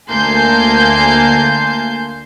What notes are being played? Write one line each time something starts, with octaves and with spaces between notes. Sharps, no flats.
D2 A#3 G#5 A5 C6 G6